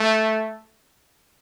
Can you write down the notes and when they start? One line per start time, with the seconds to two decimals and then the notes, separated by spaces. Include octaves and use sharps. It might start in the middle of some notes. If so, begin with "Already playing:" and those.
Already playing: A3